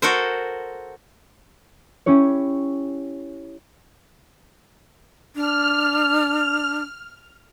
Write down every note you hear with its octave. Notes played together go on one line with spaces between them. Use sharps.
F#4 A4 A#4 C5
C#4 E4 G4 C#5
D4 F6